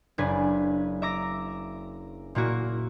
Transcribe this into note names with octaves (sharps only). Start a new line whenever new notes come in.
F#1 D4 B4 G#5
E5 A#5 D6 A#6
A#2 A#3 E4 F#4